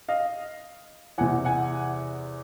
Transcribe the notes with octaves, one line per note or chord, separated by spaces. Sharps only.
D#5 F5
E2 C3 E3 F#5 G#5
F#5 G#5